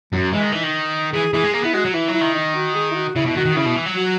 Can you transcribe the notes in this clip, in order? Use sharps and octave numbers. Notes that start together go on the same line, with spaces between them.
F#2 F#3
E3 G#3
D#3
E3 D#4
D#3
E3 G#4
E3 G#4
G#3
A#3 G#4
B3 E4
G#3 F#4
F#3
E3 E4
F#3
E4
D#3
D#4
F#4
G#4
E4
F#4
C#3 E4
B2 E4
D#3 F#4
D#3
C#3 E4
B2
E3
F#3
F#4